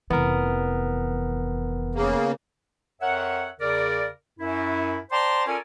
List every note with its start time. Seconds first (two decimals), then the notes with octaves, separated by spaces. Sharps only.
0.10 F1 E3 B3 A#4
1.95 C#3 A#3
3.01 F2 A#4 C#5 E5 F#5
3.60 E2 C#3 A#4 D5
4.39 F#2 E4
5.11 C5 D5 G5 A5 A#5 C6
5.47 C#4 F4 A4 A#4 D5 G#5